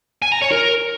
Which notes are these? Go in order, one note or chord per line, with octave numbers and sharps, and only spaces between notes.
G#5
A#5
C#5
A#4